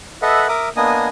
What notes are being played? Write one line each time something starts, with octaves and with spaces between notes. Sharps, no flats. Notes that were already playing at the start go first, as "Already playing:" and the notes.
A4 B4 D#5 E5 F#5
A#4 E5 D6 D#6
A#3 B3 D4 D#5 G#5 D#6